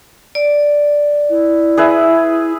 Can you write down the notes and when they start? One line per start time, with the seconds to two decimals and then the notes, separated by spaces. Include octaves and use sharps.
0.35 D5
1.30 E4
1.77 G#4 B4 E5